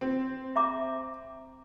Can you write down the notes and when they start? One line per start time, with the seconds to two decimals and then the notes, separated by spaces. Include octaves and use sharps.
0.01 C4
0.56 E5 A#5 D6